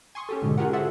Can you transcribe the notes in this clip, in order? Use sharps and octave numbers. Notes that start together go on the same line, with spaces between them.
G#5 C6 C#6 D#6
C#4 G4 A4
G#2 B2 D3 G#3
C#4 F4 G4 G#4 A#4 F#5
F#4 G#4 A4 C5 E5 F#5